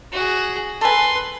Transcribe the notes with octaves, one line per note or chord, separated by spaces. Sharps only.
F#4 G#4
A4 B4 G#5 C6